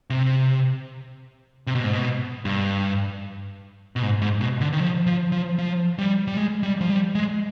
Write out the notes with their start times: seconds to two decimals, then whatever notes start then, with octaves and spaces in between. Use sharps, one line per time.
0.10 C3
1.67 C3
1.75 B2
1.84 G#2
1.92 B2
2.45 G2
3.96 B2
4.03 G#2
4.22 G#2
4.41 B2
4.61 D3
4.73 D#3
4.80 F3
5.06 F3
5.32 F3
5.58 F3
5.98 G3
6.28 G3
6.37 G#3
6.63 G3
6.81 F3
6.90 G3
7.15 G#3